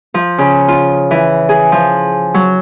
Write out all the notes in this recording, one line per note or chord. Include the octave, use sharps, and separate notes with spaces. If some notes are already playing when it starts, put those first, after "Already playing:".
F3
C#3
F4
E3
G#4
F3
F#3